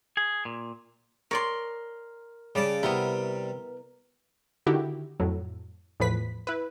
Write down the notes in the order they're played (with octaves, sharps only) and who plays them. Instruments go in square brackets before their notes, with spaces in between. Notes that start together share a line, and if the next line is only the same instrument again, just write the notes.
[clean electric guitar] G#4
A#2
[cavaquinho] A#4 C6 [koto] C#5 D5
[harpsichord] C#3 D5 A5 [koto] G3
[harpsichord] C3 G3 [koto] B3 E4 [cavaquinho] A#4
[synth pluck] D3 D#3 E4 F#4 G4
F2 A2 F#3
E2 A2 F3 B4 B6
E4 B4